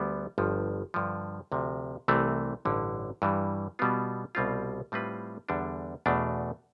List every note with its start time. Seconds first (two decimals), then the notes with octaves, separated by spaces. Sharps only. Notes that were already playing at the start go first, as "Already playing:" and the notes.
Already playing: D2 D3 G3 B3 D4
0.38 G1 G2 F3
0.94 G2 D3 F3
1.52 D2 C3 F3
2.08 C2 C3 E3 A3 C4
2.65 A1 G2 D3
3.22 G2 E3 G3
3.79 B2 G3 B3 F4
4.35 C2 B2 G3 C4 F4
4.92 A2 G3 C4 F4 B4
5.49 E2 D3 G3 D4 A4
6.06 E2 B2 A3 D4